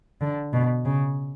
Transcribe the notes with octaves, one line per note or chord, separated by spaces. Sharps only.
D3
B2
C#3